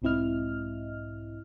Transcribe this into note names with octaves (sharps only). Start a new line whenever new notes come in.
B1 G#2 C4 E4 D#5 F6